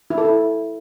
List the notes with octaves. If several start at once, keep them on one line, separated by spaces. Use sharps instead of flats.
E4
A4
E4